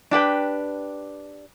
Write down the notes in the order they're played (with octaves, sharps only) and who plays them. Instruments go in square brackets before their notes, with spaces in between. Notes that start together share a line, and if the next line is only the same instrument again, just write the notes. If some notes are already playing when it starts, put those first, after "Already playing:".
[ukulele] D4 G4 B4 G5